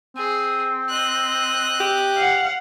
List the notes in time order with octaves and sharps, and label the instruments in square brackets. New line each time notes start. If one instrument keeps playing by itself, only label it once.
[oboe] C4 [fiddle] G#4
[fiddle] D#5 F#6
[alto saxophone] G4
[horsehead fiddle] F5 F#5